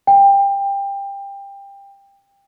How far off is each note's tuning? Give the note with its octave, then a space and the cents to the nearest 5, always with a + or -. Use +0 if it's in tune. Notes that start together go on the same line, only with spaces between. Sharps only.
G5 +20